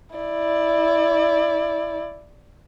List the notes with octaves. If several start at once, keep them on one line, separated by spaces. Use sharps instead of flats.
E4 D5